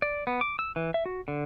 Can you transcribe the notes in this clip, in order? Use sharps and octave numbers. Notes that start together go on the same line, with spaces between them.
D5
B3
D6
E6
E3
E5
F#4
D3